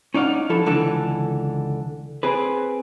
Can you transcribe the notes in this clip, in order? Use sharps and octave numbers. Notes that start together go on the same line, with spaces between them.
C#4 D#4 D5 F5 F#5
F3 E4 A4
C#2 D3 E3 A4
C4 G#4 B4